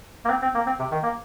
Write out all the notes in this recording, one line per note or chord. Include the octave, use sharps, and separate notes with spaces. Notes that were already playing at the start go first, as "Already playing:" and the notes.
A#3
C4
C4
A#3
C4
C3
D#3
A#3